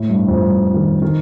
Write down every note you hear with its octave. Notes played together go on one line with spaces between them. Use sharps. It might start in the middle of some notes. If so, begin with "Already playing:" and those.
Already playing: A2
G2
F2
G2
D#3
D#3